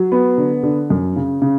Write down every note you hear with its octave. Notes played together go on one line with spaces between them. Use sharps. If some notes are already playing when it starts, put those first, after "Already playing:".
Already playing: F#3
B3
D3
D3
F#2
C#3
C#3